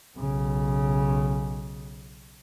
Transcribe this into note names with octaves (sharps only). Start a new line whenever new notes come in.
B1 C#3